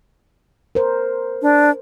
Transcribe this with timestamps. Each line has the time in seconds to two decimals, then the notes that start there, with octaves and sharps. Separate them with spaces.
0.75 A#4 C5
1.42 D4